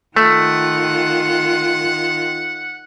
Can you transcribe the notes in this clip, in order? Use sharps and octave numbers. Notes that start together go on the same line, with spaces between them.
D#3 A3 F4 F#5